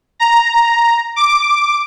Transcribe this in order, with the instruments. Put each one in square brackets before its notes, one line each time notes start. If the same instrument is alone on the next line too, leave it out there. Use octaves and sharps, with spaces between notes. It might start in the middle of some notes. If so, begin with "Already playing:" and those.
[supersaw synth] A#5
D6